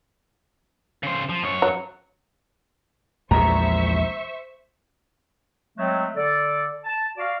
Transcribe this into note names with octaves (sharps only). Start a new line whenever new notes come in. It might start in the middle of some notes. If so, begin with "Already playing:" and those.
C#3 C5
F3
F#2 C#5
F#3
A#1 E2 A#2 G#3 C5 E5 A#5 C#6
F#3 G#3 A3 C4
D3 A4 D5
A5
F#4 D5 F5